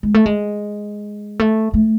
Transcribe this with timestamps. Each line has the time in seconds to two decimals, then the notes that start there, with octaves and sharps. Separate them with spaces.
0.03 G#3
0.14 A3
0.26 G#3
1.40 A3
1.74 A3